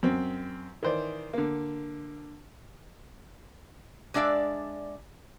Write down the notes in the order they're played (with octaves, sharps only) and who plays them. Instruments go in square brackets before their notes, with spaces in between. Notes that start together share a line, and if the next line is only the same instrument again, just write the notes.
[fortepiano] F#2 C4
D#3 E3 C5 D5
D3 A#3
[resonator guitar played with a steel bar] G#3 D4 D5 E5 F5